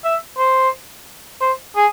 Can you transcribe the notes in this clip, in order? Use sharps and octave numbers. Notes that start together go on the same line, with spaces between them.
E5
C5
C5
G#4